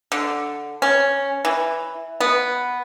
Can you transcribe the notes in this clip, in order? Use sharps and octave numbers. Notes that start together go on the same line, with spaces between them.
D3
C#4
E3
B3